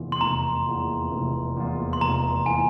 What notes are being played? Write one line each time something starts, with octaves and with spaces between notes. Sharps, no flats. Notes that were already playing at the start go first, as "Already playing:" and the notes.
Already playing: F1 E2 E3 A#3 F4
C6
F1 A#5
E2 E3 A#3 F4
F1
E2 E3 A#3 F4
C6
F1 A#5
E3 A#3 F4 G#5